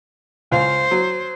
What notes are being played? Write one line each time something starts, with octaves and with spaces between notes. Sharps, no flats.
C#2 C5 F5
F#3